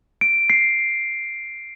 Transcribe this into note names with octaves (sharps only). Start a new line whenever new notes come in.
D7
C7